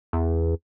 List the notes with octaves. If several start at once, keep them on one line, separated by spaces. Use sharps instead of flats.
E2